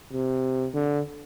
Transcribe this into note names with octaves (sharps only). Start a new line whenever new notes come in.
C3
D3